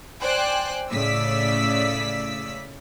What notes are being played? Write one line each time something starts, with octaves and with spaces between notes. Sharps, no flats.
C5 D5 G5 G#5 F#6
A2 C#3 D5 E6 B6